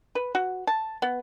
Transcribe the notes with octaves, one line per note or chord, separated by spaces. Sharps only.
B4
F#4
A5
B3